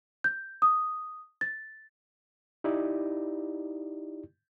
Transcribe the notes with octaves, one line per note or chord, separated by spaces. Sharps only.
G6
D#6
A6
D#4 E4 G4 D5